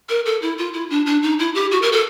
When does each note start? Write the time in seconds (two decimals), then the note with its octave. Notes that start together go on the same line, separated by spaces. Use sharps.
0.09 A#4
0.25 A4
0.42 E4
0.58 F4
0.73 E4
0.90 D4
1.06 D4
1.22 D#4
1.39 E4
1.55 G4
1.71 F#4
1.82 A#4
1.92 A4